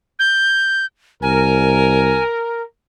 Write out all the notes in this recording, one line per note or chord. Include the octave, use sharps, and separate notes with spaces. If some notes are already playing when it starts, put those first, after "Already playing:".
G6
C2 A#4 G#5